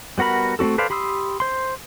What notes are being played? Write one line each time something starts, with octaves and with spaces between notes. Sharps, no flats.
G3 B3 F#4 A#4 B5
A3 C4 C#4 F#4 A4
A4 B4 C5 D5 F5
G4 B5 C6 D#6 E6
C5 C6